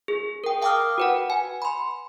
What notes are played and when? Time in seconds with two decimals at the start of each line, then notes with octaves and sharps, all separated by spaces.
0.08 G#4
0.44 A#4 G5
0.62 F5 G5 A5 D6 D#6 F6
0.98 F#4 B4 F#5
1.30 G#5
1.62 B5 C6